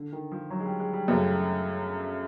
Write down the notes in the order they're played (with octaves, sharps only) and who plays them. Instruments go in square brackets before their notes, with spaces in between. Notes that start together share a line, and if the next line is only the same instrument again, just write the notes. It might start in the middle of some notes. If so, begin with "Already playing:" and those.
Already playing: [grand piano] D3
D#3
F3
F#3
G#3
G3
G#3
G3
[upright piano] F#2 C#3 F#3 A3